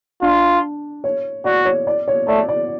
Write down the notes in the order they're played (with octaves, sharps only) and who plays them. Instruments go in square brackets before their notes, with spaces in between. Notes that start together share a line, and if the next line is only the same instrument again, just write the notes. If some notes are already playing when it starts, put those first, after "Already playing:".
[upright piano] D4 [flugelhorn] F4
[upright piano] C#5
[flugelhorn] F#4 [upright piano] D5
[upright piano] C#5
D5
C#5
[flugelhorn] A3 [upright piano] D5
[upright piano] D5